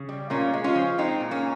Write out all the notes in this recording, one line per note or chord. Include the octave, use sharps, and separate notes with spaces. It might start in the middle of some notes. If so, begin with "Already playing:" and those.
Already playing: C#3
G3
A#2 A#3 C#4
G#3
C#4 F4
F3
G#3 C4 D#4
A#2
A#3 C#4